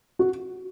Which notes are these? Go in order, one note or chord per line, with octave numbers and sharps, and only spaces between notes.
F#4